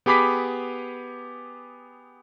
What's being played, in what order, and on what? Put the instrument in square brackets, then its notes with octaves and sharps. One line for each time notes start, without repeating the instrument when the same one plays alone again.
[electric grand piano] B3 G4 G#4 B5 D6 B6